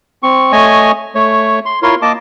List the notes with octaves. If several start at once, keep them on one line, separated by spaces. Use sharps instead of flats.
C4 C#6
A3 C#5 D#5 G#5
A3 C#5
C6
E4 F4 A#4 C#5 C6
A#3 D#5 A5 D6